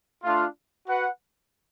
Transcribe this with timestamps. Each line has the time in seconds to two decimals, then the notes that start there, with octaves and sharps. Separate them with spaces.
0.24 A3 D4 F4
0.86 F#4 B4 F#5